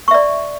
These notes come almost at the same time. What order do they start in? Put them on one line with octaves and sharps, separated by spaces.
C#6 E5 D5